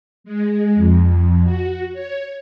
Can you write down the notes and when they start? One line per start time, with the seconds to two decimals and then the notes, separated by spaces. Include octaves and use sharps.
0.24 G#3
0.75 F2
1.44 F#4
1.92 C#5